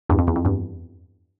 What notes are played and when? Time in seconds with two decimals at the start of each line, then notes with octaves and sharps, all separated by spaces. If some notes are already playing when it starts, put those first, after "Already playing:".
0.09 E2 G2
0.19 F2
0.27 E2
0.36 F2
0.45 E2 G2